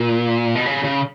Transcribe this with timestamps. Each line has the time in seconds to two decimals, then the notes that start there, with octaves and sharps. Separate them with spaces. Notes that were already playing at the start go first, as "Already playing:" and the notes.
Already playing: A#2
0.55 B2
0.66 C#3
0.84 C#3